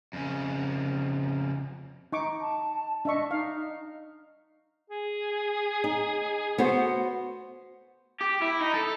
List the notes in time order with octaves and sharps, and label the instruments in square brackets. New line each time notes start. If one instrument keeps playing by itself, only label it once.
[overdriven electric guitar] F2 C#3
[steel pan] D#4 C#6 D6
[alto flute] A5
[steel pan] D4 E5 C#6 [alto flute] D#5
[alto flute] D#4 [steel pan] F5
[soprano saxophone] G#4
[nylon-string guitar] D#4
B3 F#4 C5
[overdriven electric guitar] G4
E4
D#4
A4